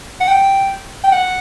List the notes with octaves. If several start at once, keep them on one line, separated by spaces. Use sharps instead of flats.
F#5
G5
G5
F#5